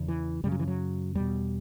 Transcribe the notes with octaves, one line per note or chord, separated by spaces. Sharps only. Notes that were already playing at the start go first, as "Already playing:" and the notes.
Already playing: E2 C#3
E3
F#2 C#3 G3
F#3
E3
F#3
E2 B2 G3